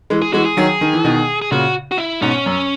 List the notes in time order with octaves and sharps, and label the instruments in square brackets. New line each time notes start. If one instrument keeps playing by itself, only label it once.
[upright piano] E3 G#3
[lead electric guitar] G#4
[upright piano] E3 G#3 [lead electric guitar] F#4
[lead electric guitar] G#4
[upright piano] D#3 F#3
D#3
E3
B2 D#3
[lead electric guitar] G#4
[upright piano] A#2 C#3 [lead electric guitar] F#4
[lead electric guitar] F#4
E4
[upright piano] G#2 B2 [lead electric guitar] C#4
[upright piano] F#2